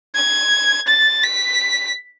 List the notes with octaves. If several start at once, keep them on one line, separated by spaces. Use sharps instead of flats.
G#6
A6
B6